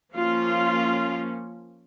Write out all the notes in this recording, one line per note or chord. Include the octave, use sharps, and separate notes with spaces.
F3 A#3 C#4 F4